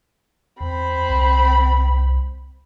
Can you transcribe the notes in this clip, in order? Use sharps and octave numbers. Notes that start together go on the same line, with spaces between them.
E2 C4 B5
C2